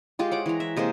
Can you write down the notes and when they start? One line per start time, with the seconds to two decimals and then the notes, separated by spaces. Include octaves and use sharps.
0.19 G#3 F4 G4
0.31 C#5 F#5 D6
0.46 E3 A#5
0.60 E5
0.76 C3 G#3 A#3 C5